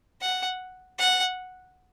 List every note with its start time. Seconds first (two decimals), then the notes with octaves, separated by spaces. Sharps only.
0.21 F#5
0.99 F#5